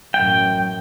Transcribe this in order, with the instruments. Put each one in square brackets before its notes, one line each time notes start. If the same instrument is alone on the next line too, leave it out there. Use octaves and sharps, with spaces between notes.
[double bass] A1 F#2 [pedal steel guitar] G5